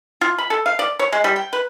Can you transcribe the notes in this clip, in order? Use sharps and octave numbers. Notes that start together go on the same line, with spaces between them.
F4
B5
A4
F5
D5
C#5
G#3
G3
G5
B4